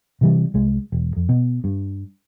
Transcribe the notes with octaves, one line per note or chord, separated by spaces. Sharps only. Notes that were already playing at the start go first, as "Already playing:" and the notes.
C3 E3 G3
C2 G#3
E1
F2
B2
G2